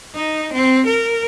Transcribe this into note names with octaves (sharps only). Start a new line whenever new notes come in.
D#4
C4
A#4